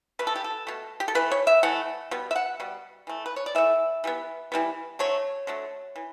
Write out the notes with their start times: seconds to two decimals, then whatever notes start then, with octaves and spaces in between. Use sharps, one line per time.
0.19 B2 A3 B4
0.27 A4
0.36 G4
0.44 A4
0.67 B2 A3
1.00 G4
1.08 A4
1.15 E3 A3 B4
1.32 C#5
1.47 E5
1.63 E3 A3 F#5
2.11 B2 G3 B3
2.31 E5
2.36 F#5
2.60 B2 G3
3.07 E3 A3
3.26 B4
3.36 C#5
3.46 D5
3.55 E3 A3 E5
4.04 E3 G3 B3
4.52 E3 G3 B3
4.99 D3 F#3 A3 C#5
5.47 D3 F#3 A3
5.96 E3